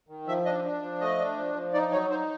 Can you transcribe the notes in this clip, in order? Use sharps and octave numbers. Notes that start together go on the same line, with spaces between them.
D#3
F3 E5
D4 D#5
D4
F3
A3 D#5
D4
F3
F3
D#4 D5
F#3 C#5
D#4 C5